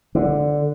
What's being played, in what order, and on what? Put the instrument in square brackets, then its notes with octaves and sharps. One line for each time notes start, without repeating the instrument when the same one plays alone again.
[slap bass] D3